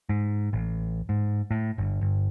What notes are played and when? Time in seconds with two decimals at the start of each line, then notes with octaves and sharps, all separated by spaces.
0.09 G#2
0.53 A1
1.09 G#2
1.51 A2
1.78 G1
2.01 G1